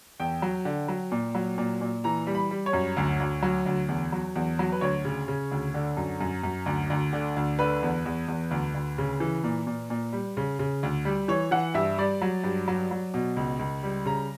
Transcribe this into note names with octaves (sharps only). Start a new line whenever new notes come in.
E2 G5
F#3
D3
F#3
A#2
F#3
A#2
A#2
E3 A#5
G3
B5
G3
C#5
F#2
D2
D2
F#3
D2
E2
F#3
E2
F#3
B4
D2 C#5
C#3
C#3
D2
D3
F#2
F#2
F#2
D2
D2
D3
D2
D3 B4
E2
E2
E2
D2
D2
C#3
E3
A#2
A#2
A#2
G3
C#3
C#3
D2
G3
E3 C#5
E3 F#5
G2 E5
G3 D5
F#3
G2
F#3
F#3
B2
C#2
C#2
G3
C#3 A#5